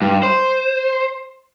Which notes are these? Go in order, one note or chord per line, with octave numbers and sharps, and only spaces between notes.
G2
C5